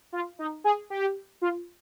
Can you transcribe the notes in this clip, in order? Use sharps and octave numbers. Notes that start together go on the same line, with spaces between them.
F4
D#4
G#4
G4
F4